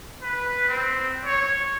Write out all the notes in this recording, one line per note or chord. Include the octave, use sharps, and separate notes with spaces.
B4
C4
C#5